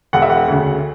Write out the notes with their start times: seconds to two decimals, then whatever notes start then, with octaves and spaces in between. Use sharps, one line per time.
0.13 E1 F#5
0.22 E5
0.30 F#5
0.48 D2 C#3